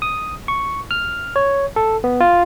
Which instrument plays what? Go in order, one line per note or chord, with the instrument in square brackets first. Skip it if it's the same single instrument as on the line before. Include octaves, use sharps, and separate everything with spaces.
[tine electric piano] D#6
C#6
F6
C#5
A4
B3
F4